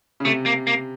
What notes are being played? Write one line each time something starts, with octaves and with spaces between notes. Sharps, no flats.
C#3
C3 A3
A#3
A#3